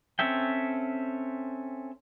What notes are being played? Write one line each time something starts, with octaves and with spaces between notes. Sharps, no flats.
C4 C#4 A4 E5 G5